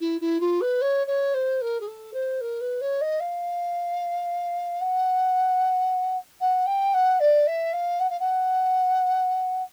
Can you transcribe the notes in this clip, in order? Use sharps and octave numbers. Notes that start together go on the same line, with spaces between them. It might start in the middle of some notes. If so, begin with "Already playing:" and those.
E4
E4
F4
B4
C#5
C#5
C5
A#4
G#4
A4
C5
A#4
B4
C#5
D#5
F5
F#5
F#5
G5
F#5
D5
E5
F5
F#5
F5
F#5